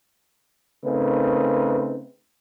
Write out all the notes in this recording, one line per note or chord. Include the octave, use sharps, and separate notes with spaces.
C#3 A3 C4 D#4 A#4 B4